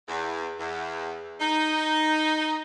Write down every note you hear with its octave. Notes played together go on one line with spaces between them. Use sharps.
E2
E2
D#4